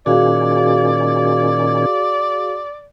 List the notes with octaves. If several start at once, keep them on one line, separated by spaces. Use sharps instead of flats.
A#2 D#3 C#4 F#4 G#4 D5 F5